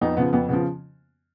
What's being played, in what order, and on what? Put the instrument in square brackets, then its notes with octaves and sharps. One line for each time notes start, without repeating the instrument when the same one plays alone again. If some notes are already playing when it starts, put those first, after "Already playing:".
[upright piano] F2 B3 D#4
C#3 F3 B3
F2 B3
C#3 F3 B3